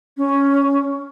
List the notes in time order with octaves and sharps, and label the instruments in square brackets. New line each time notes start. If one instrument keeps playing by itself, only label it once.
[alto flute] C#4